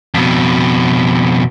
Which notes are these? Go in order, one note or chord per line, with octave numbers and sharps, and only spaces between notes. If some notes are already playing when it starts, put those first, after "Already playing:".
F2 B2